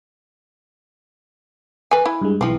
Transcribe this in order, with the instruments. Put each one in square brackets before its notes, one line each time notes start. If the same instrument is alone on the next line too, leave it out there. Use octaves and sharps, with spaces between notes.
[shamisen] B4 G#5
E4
[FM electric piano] G2 G#3
[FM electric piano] B1 E3 [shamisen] F3 C4